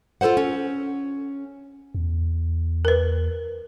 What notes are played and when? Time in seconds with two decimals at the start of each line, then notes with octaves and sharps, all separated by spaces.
0.21 F4 A4 B4 C5 F#5
0.37 C#4
1.94 E2
2.85 A#4 B4